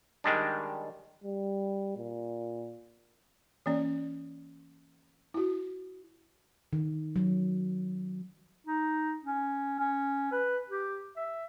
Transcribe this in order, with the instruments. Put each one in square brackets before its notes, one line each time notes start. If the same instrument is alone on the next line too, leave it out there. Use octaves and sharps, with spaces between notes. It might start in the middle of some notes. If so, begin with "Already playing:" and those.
[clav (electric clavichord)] D#3 G3 G#3 D4
[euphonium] G3
A#2
[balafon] E3 A#3 C#4 D5
E4 F#4
[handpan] D#3
F#3
[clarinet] D#4
C#4
C#4
B4
G4
E5